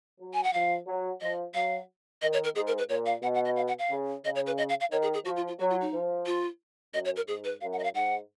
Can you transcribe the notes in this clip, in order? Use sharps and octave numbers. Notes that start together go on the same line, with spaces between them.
F#3
G#5
F#5
F3 F5
F#3
F3 D#5
F#3 F5
D#3 D#5
C#5
A#4
G#2 G#4
A#4
B4
A#2 C#5
F5
B2 F#5
F#5
D#5
F5
F#5
F5
C#3
C#3 D#5
C#5
B4
D#5
F5
F5
D#3 C#5
G#4
G#4
F3 F#4
F4
F4
F#3 F#4
F4
D#4
F3
F4
F#2 D#5
C#5
A#4
G#2 G#4
B4
F#2 F5
F#5
D#5
F5
G#2 F#5